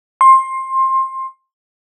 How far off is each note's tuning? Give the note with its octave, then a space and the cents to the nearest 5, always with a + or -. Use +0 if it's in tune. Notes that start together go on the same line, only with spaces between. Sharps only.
C6 +20